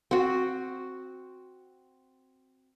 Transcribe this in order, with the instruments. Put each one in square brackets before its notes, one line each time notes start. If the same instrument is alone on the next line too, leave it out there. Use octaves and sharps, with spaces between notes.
[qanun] C4 F#4